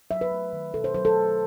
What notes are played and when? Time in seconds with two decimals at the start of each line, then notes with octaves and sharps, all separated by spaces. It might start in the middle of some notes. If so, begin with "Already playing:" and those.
0.11 F#3 E5
0.21 B4
0.31 A3
0.53 D#3
0.74 B2 A4
0.84 C5
0.94 F#3 C5
1.05 A4
1.16 A3